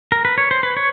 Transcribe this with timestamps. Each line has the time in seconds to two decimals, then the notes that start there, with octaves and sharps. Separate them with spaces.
0.12 A#4
0.25 B4
0.38 C#5
0.51 C5
0.63 B4
0.77 C#5